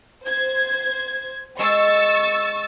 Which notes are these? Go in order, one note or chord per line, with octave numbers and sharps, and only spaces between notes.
C5 G#6
G#3 G#4 C#6 E6 A6